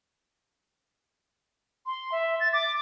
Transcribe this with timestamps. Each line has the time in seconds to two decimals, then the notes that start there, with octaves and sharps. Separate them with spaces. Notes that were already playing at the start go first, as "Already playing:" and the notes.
1.86 C6
2.12 E5
2.40 A6
2.53 D6